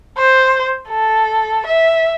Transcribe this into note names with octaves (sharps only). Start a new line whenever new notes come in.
C5
A4
E5